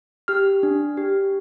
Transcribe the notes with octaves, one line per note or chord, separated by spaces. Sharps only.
G4 F6
D4
G4